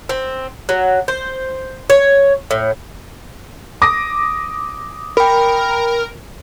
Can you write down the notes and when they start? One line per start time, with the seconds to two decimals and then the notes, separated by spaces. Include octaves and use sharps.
0.09 C4
0.69 F#3
1.08 C5
1.90 C#5
2.51 A2
3.82 D6 D#6 A#6
5.17 A#4 G5 B5